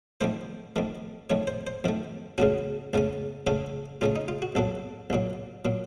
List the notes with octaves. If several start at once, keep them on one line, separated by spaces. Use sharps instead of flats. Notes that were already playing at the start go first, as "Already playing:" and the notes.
F2 D#3 A3 C5
F2 D#3 A3
F2 D#3 A3 C#5
C5
C5
F2 D#3 A3
C#2 C#3 A3 C#4 F#4
C#2 C#3 A3 C#4
C#2 C#3 A3 C#4 A4
C#2 C#3 A3 C#4 F4
D#4
F4
F#4
C2 A#2 F#3 A4
C2 A#2 F#3
A#2 F#3